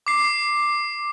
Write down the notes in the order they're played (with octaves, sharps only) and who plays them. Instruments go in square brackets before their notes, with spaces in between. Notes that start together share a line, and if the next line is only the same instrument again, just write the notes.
[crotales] D6 C7